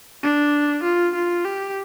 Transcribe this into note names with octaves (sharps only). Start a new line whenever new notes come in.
D4
F4
F4
G4